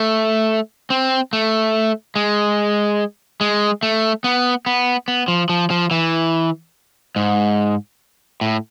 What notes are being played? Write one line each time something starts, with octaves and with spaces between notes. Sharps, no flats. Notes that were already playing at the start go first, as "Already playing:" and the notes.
Already playing: A3
C4
A3
G#3
G#3
A3
B3
B3
B3
F3
F3
F3
E3
G#2
A2